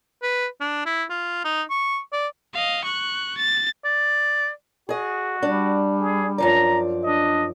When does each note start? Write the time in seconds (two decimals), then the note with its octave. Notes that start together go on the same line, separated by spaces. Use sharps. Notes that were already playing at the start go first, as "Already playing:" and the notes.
0.23 B4
0.61 D4
0.86 E4
1.10 F4
1.45 D#4
1.70 C#6
2.13 D5
2.54 D#5 F5
2.85 C#6 F#6
3.37 A6
3.84 D5
4.89 F#4 G#4 D#5
5.43 G3 D4
6.01 G#4
6.38 F#2 F3 D5 A#5
7.04 D4 D#5